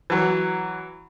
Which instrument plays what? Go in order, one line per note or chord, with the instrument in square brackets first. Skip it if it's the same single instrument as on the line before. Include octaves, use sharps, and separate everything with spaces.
[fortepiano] E3 F#3